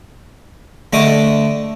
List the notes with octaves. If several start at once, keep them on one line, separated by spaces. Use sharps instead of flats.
D3 A3 D#5 D6 D#6